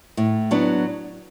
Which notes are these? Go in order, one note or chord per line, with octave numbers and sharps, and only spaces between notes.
A2
F#3 B3 D4